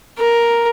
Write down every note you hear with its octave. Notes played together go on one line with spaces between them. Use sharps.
A#4